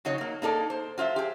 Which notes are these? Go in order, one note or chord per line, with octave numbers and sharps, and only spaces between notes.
C#3 F#3 D#4 C#5
F#3 A#3
A#3 D#4 A4 D5
C5
F#3 F4 C5 E5
G4 G#4